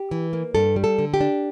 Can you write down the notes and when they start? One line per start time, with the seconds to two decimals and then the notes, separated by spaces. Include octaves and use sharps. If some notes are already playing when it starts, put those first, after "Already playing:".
Already playing: G4
0.11 E3
0.33 A#3
0.55 G2 A4
0.76 G3
0.84 A4
0.98 D3
1.14 G4
1.21 D4